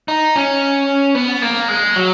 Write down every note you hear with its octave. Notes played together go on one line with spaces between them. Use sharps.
D#4
C#4
B3
A#3
G#3
F#3